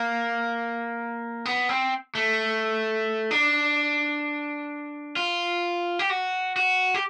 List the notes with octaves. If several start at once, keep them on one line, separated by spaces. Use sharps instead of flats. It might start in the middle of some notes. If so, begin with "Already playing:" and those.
Already playing: A#3
B3
C4
A3
D4
F4
G4
F#4
F#4
G4